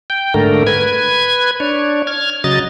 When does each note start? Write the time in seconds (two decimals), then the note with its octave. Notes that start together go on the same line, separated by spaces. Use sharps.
0.10 G5
0.34 G#2 D3 A3 A#4
0.67 B4 G#6
1.60 D4 C#5
2.07 F6 G#6
2.44 C#3 F#3 D#5 A6